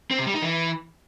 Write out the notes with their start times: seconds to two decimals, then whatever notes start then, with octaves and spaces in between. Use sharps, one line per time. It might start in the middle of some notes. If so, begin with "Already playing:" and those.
0.11 C4
0.19 C3
0.26 G3
0.34 D#4
0.42 E3